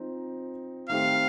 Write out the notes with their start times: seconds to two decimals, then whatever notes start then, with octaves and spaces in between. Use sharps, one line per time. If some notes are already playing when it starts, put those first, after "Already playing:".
Already playing: F3 C4 D#4
0.89 D#3 A3 C4 G4 F5